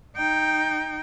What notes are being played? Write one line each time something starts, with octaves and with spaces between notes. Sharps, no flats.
D#4 G5